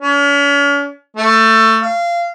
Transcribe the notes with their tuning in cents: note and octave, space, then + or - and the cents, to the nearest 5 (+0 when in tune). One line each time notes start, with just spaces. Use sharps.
C#4 +40
A3 +20
F5 -20